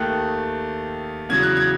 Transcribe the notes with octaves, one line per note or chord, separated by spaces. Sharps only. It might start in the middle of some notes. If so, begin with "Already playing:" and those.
Already playing: D#2 D#3 A3 F#6
E2 C#3 F#3 G#6
F#6
G#6